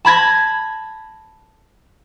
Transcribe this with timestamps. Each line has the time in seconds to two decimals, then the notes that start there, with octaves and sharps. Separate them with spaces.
0.05 A5 B5 G#6 A#6